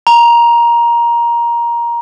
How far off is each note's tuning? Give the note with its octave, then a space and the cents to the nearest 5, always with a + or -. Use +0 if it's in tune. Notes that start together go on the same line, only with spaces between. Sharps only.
A#5 +15